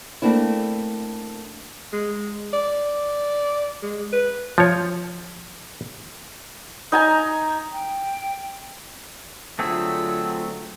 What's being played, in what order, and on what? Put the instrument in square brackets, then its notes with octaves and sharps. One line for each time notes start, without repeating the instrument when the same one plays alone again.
[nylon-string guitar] A3 A#3 C4 D4 E4
[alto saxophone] G#3
D5
G#3
B4
[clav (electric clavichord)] F3 C#5
[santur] D#4 G#5 A#5
[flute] G5
[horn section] D3 F#3 [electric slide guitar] A3 C4 G#4 [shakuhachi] F4 [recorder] E6